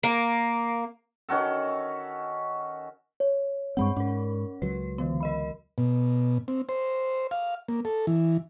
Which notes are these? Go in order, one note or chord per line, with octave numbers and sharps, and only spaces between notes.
A#3
D#3 C#4 F#4 A4
C#5
G2 G#3 C4 F#5 B5 C#6
G#2 C#4 A#4
C#2 F#3 B4
D3 E3 B3
A#4 D#5 B5
B2
C4
C5
F5
A#3
A4
E3